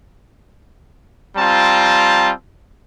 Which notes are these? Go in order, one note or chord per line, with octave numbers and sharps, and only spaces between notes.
G3 C4 F4 A5 A#5